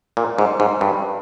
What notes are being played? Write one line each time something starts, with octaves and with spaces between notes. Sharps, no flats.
A#2
G#2
G#2
G2